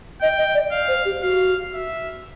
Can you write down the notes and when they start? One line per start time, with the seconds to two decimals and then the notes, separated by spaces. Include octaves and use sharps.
0.21 D#5 G5
0.38 D#5
0.55 D5
0.71 F5
0.88 C5
1.05 G4
1.22 F#4 F5
1.73 E5